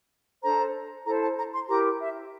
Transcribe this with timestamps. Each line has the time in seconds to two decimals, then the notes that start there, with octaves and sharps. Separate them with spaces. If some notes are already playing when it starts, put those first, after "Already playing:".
0.43 D4 A4 C5 A#5
1.05 E4 A4 C5 A#5
1.21 A5
1.37 A#5
1.53 C6
1.67 E4 G4 A#4 A#5
1.99 E5